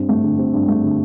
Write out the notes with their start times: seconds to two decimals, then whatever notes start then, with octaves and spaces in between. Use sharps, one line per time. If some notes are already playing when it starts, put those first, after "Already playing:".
Already playing: G2 C4
0.09 A3
0.23 D3
0.38 C4
0.53 G2
0.68 A3
0.83 D3